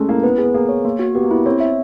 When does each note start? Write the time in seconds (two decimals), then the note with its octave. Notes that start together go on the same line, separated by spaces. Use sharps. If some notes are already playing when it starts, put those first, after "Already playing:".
Already playing: G#3 A3 C#4
0.09 A#3 E4
0.23 B3 B4
0.38 G#4
0.44 B3
0.54 A#3 G#4
0.69 C#5
0.85 A#3
0.99 F#4
1.15 B3 G4
1.24 A#3
1.31 B3 E4
1.46 C4 C#5
1.60 E5